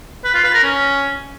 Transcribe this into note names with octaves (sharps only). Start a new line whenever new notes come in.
B4
F4
B4
A#4
C#4